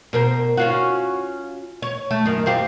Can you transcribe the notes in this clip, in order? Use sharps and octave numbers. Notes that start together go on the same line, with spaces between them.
B2 A#4 C5
C#4 F4 F#4
C#5
A3
F#2 D#3
C4 F4 G4